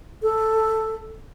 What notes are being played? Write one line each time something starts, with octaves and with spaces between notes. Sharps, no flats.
A4